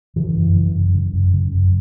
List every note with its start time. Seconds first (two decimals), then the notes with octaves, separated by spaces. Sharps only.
0.16 C#3 E3
0.37 F#2
0.56 C#3
0.75 F#2
0.94 C#3
1.13 F#2
1.33 C#3
1.52 F#2